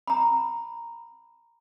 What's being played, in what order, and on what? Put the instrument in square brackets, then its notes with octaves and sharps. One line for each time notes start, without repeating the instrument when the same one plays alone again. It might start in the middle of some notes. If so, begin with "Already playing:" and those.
[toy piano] A#5 B5